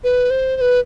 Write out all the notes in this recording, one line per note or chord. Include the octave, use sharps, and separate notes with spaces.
B4
C5
C5
B4